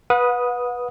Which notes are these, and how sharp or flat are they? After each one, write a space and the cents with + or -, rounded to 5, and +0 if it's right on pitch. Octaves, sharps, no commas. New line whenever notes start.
B4 -10 F#5 -35 D#6 +0